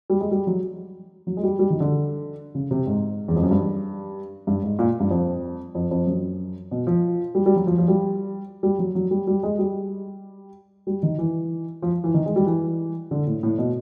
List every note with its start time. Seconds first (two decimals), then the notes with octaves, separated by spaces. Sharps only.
0.10 G3
0.21 G#3
0.31 G3
0.47 F#3
1.27 F#3
1.37 G#3
1.43 G3
1.59 G3
1.70 D#3
1.80 D3
2.55 C#3
2.71 C3
2.87 G#2
3.28 E2
3.36 F2
3.43 F#2
3.51 G2
4.47 G2
4.63 G#2
4.79 A#2
5.00 G2
5.11 F2
5.75 F2
5.91 F2
6.07 F#2
6.71 B2
6.87 F3
7.35 G3
7.46 G3
7.56 F#3
7.67 F3
7.78 F3
7.88 G3
8.63 G3
8.79 F#3
8.95 F#3
9.11 G3
9.27 G3
9.43 G#3
9.59 G3
10.87 G3
11.03 D#3
11.19 E3
11.82 F3
12.04 E3
12.14 D#3
12.26 G#3
12.36 G3
12.46 E3
13.11 D3
13.26 A2
13.43 A2
13.58 B2